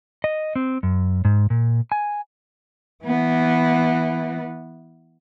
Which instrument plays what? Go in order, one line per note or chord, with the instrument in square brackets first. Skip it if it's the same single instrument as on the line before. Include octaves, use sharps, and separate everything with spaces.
[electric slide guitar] D#5
C4
F#2
G#2
A#2
G#5
[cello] E3 B3